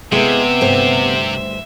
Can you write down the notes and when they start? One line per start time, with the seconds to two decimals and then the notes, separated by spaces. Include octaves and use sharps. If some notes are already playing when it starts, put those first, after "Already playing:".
0.12 C3 G#3 B3 E4 G#4 E5
0.61 D2 G2 C5